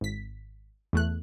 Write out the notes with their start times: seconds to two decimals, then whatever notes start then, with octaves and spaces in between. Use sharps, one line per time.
0.01 G#1 B6
0.93 E2 A3 F#6